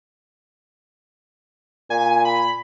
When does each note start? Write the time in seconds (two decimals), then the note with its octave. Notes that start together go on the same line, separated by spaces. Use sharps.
1.90 A#2 G#5
2.25 B5